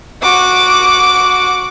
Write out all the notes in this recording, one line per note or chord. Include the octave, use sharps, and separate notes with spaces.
F#4 D6